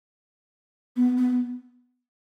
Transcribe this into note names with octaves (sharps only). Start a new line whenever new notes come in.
B3
B3